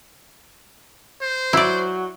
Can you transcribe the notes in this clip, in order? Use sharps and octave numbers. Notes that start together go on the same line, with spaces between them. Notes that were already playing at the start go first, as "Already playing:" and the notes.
C5
F#3 E4 D5